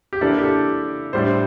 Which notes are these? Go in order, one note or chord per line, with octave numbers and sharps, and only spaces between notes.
G4
E3 A#3 D4 A4
G4
A4
A2 G3 D4 C5